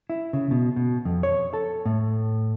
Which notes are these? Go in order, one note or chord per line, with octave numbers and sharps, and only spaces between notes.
E4
C#3
B2
B2
F2
C#5
A4
A2